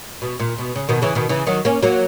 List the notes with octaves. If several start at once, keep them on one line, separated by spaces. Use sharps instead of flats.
B2
A#2
B2
C#3
B2 D#3
C#3 E3
B2 D#3
C#3 E3
D#3 F#3
A#3 C#4
F#3 A#3